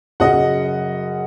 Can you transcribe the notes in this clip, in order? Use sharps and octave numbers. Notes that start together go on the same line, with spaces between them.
F#2 C#3 F#3 D#5 F#5